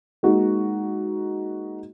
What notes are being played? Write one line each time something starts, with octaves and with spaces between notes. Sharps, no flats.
G#3 A#3 D#4 F#4